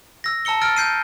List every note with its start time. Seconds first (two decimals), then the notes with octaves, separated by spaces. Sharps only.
0.24 E6 A#6
0.45 A5 A#5 E6 C#7 G7
0.62 E6 F6 A6 D7
0.76 G6 C7 D#7